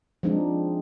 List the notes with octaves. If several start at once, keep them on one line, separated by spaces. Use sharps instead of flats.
F3 G#3 C4 D4 D#4